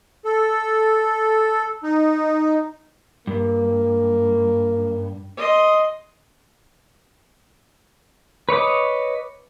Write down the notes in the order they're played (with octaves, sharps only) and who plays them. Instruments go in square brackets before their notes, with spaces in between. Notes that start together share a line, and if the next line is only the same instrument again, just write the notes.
[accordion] A4
D#4
[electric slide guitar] G2 [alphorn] A#3
[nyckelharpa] D#5 C6
[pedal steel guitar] B4 C#5 D#5 D6